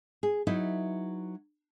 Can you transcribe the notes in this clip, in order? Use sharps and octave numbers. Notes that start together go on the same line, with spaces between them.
G#4
F#3 D#4 E4 B4